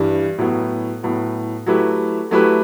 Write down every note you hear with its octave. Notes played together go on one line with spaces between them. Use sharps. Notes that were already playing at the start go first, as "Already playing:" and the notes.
Already playing: G2 E3 G3
A2 F#3 B3
A2 F#3 B3
F#3 A3 E4 G4 B4
F#3 A3 E4 G4 B4